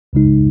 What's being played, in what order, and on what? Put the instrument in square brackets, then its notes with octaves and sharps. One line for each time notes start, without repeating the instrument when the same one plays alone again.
[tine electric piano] C#2 C#3 G#3 D#4